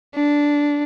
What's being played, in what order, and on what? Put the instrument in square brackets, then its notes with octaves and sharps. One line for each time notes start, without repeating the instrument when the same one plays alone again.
[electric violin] D4